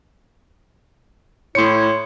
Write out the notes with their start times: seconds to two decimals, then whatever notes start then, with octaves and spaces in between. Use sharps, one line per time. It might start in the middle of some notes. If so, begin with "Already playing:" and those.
1.55 A2 E4 C#5 C6 C#7